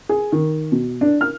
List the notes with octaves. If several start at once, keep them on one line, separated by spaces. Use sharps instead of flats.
G#4
D#3
B2
D4
F6